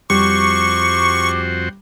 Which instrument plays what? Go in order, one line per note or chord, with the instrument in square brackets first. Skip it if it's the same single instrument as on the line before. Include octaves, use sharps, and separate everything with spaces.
[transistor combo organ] F2 F#4 C5 [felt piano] G3 [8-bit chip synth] C#6 [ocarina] D6